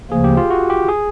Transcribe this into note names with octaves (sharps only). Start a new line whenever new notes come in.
D2 C#3 F3 A#3 G#4
G4
F4
F#4
G4
G#4